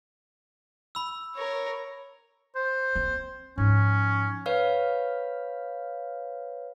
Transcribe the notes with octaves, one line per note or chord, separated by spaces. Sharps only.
B5 E6
A#4 C#5
C5
C4
G#2 F3 C#4
B4 C#5 F5 F6